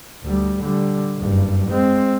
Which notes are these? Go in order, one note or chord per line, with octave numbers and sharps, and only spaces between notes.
D2 G3
D3 G3
F#1 G2
G#3 C4